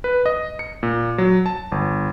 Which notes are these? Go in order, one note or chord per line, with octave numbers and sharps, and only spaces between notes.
B4
D#5
C#7
A#2
F#3
A5
G1